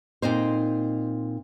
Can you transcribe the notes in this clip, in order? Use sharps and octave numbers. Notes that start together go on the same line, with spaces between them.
A#2 C4 D#4 C5